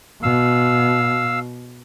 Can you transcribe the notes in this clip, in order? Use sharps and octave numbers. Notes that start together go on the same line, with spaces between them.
B2 F5 E6